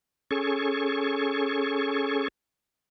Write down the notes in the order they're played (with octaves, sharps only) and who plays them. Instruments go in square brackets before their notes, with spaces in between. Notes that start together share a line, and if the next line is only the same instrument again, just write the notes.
[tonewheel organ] C#4 G#4 A4 C#6